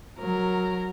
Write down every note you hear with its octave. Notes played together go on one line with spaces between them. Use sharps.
F#3 A#4